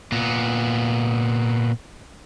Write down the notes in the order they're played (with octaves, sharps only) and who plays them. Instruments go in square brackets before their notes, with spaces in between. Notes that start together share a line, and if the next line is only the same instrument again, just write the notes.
[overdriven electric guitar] A#2 B3